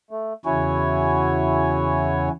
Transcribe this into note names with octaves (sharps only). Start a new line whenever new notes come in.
A3
E2 C#3 E4 F#4 C#5 G#5